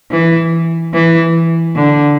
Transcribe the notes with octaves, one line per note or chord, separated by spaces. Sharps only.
E3
E3
D3